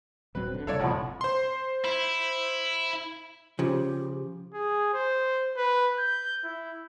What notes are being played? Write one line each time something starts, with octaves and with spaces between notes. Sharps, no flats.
D#1 F#3 C4 B4
D3
F#1 C2 E4 A4 C#5 D5 F5
A1 B2 F3 F#5 A5
C5 C6
E4
C#3 F3 G4
G#4
C5
B4
G6
E4